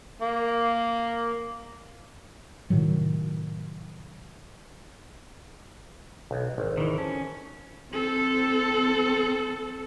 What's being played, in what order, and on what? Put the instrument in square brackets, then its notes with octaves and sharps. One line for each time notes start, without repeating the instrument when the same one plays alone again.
[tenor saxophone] A#3
[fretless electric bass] A2 C3 D#3 F#3
[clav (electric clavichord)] B1
G#1
[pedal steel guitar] D#3 E3
[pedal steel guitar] C#4 [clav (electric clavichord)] A4
[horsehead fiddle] C4 A4